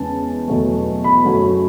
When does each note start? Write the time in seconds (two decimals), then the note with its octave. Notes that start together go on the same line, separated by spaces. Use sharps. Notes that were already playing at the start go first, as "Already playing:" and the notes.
Already playing: E2 C#3 G#3 A5
0.48 E2 B2 F#3 A3
1.04 B5
1.24 F#2 C#3 F#3 A3